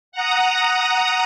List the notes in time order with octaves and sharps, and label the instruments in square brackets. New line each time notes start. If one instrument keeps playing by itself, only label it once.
[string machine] F#5 A#5 D#6